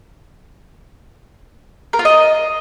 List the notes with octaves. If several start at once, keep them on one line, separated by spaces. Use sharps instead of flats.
A#4
F4
D#5